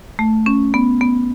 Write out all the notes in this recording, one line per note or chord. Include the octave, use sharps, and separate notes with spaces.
A3
C#4
B3
B3